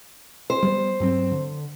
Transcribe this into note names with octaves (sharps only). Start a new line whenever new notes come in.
C5
G3 G#3 B3
G2 F#3 C4
D3